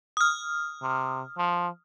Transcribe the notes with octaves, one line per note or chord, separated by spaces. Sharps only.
D#6 F6
C3
F3